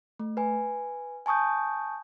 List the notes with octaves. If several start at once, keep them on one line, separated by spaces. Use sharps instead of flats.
A3
B4 G#5
G#5 A5 C#6 D#6 G6